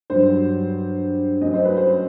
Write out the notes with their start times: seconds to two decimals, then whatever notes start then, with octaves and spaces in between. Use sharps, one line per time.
0.10 G2 F#3 C5
1.41 F#2 F#3 D#5
1.53 C5
1.65 B4
1.77 C5